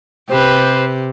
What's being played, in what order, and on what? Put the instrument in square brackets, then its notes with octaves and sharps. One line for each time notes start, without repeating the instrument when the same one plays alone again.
[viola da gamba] C3 [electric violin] G4 B4 [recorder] C5